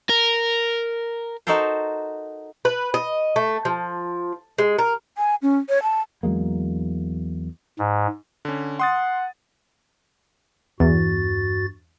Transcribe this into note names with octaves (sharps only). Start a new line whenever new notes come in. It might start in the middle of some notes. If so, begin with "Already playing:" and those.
A#4
D#4 F#4 A4 A#4 C5
B4
D#5
A3
F3
G#3
A#4
G#5
C#4
C#5
A5
E2 F#3 G#3 A#3
G#2
D3 C#4
F#5 C6 D#6 A6
E2 G2 F#4 A6